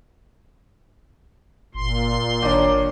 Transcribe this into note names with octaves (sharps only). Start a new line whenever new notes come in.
G1 A#2 C6
G#1 D#3 D4 C#5 A#5 D6